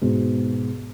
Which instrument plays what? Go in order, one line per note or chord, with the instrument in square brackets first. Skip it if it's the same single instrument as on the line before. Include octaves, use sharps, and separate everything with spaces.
[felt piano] G#2 B2